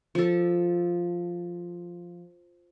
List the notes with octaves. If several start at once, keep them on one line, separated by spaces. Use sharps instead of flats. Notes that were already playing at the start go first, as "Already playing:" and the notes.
F3 A4